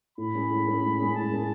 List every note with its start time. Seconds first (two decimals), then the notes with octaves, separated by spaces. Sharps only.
0.18 A2 B5
0.34 G#3 C#4 G#4
0.50 A2
0.66 G#3 C#4 G#4
0.82 A2
0.98 G#3 C#4 G#4
1.15 A2 A5
1.31 G#3 C#4 G#4